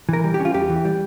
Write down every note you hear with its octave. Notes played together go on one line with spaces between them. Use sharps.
E3 A#4
G3
G4
C#4
F4
E2 G4
E3
G3